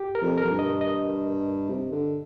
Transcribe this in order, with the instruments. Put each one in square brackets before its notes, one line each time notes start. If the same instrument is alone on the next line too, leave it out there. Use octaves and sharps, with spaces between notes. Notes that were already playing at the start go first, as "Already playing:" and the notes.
Already playing: [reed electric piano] G4
A#4
[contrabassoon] F2
[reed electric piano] A#4
[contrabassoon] F2
G2
[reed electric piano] D#5
D#5
[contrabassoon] C3
D3